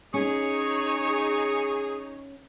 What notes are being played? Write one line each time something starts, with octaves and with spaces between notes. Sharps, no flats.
C#4 D#4 G#4 C#5 C#6